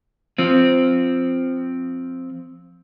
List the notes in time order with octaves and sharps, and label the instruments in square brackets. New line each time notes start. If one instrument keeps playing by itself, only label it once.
[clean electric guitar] F3 C4